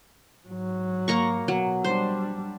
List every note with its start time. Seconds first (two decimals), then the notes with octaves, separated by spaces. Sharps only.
0.48 G#2 F#3
1.08 A#3 A#5 C#6
1.48 B2 F#3
1.84 G3 D4 C5